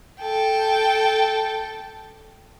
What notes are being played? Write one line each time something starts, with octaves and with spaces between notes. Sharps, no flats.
A4 G5